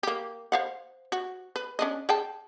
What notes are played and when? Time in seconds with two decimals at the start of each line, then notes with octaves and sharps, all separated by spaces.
0.03 A#3 G4
0.52 C5 F5 F#5
1.12 F#4
1.56 B4
1.79 C#4 D4 D#5
2.09 G#4 G5 A5